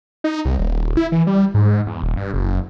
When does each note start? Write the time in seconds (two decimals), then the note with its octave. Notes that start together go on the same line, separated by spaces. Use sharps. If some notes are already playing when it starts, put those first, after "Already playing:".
0.24 D#4
0.45 C2
0.59 D#1
0.97 E4
1.12 E3
1.27 G3
1.54 G#2
1.87 E2
2.03 D#1
2.17 G2
2.33 F#1